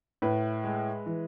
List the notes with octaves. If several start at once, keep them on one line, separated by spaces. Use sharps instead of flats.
A2 B4
G#3
E3